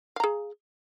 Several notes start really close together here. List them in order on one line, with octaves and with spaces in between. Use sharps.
F5 A#5 G#4